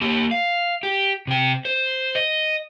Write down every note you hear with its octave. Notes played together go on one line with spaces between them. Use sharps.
A#3 G4
F5
G4
C3 G5
C5
D#5